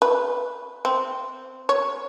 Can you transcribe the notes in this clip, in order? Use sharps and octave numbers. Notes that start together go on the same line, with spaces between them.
B4
C4
C#5